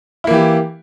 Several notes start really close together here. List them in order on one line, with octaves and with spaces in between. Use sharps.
E4 A#3 E3 G4